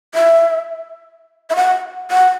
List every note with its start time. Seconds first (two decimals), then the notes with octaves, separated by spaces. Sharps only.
0.15 E5
1.50 E5
1.56 F#5
2.11 F#5